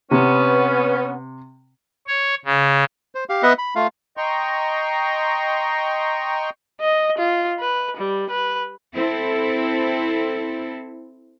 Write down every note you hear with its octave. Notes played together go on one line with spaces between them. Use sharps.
C3 B3 C#4
C#5
C#3
C5
G4 F5
B3 B4 D#5 E5 F#5
B5
A3 F4 F5
D#5 G5 A#5 C6 C#6
D#5
F4
B4
G3
B4
C4 E4 A4